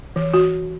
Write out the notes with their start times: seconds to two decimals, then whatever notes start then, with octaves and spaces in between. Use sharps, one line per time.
0.16 E3
0.34 F#4